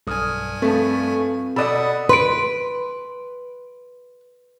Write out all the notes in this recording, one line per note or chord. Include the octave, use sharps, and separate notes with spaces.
B1 G2 G#5 D#6 F6
F3 A3 C4 B4
B2 A4 D5 D#5 F#5 B5 D#6
B4 C6 D7